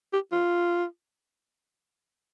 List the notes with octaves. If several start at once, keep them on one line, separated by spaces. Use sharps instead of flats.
G4
F4